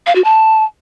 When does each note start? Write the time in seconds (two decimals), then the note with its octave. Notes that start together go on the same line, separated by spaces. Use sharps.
0.07 F5
0.15 F#4
0.24 A5